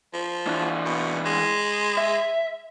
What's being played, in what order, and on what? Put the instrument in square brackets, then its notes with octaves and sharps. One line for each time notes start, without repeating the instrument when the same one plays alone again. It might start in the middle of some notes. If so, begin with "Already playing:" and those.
[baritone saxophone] F3
[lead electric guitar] E3 D4
[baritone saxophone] B2
G#3
[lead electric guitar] E5